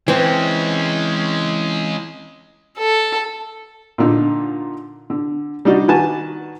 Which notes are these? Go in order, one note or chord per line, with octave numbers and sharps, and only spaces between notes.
E3 G#3 C4 C#4
A4
A#2 D3 D#4
D3
G3 D4 D#4 F#4
D#3 F#4 B4 G#5 A5